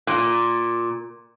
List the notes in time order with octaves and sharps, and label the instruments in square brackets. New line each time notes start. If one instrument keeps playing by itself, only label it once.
[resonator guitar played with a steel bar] A#2